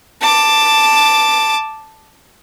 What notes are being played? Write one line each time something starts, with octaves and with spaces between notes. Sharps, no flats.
A5 D6